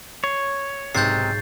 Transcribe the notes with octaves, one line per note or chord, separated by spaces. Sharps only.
C#5 C7
B1 G#2 C3 G#3 G6 A6 C7